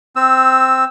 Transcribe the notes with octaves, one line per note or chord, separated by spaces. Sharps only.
C4 E6